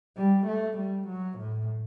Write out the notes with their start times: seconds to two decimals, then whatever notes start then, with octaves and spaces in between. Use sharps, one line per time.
0.17 G3
0.47 A3
0.78 G3
1.08 F#3
1.39 A2